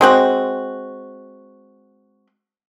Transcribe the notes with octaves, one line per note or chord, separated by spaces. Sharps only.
G#3 C4 F#4